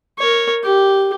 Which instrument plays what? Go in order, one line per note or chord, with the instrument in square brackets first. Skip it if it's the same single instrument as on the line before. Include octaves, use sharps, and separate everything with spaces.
[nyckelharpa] A#4 C#5
G4